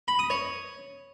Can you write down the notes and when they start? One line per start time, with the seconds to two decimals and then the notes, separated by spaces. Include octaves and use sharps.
0.08 B5
0.19 D#6
0.30 C#5